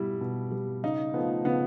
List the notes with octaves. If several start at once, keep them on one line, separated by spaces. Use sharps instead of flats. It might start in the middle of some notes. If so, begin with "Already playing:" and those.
Already playing: B2 G3 E4
B2
G3
C#3 D#4
F3 A3 B3
C#3 B3